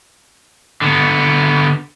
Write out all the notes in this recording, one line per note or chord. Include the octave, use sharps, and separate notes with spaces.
D3 B3